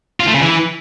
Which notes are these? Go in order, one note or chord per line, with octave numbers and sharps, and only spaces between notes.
F4
A3
C#3
E3